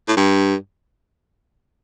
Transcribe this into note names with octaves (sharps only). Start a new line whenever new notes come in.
A2
G2